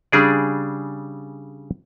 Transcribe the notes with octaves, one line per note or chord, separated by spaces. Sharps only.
C#3 G3 D4 G#4 D5